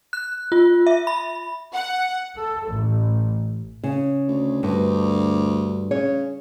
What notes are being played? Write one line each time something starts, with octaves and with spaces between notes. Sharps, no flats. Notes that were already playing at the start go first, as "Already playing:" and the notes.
F#6
F4
E5
B5
F#5
A4
A1
C#3
D2
D2 G2
C#3 C#5